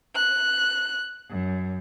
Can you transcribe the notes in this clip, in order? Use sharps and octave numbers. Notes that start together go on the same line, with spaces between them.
F#6
F#2